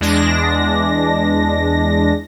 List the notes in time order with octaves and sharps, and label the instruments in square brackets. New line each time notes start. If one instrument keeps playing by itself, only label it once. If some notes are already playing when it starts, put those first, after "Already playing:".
[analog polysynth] E2 G#3 D4 A#6